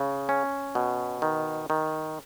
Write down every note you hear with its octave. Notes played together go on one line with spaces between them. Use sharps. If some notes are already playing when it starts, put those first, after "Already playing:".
Already playing: C#3
C#4
B2
D#3
D#3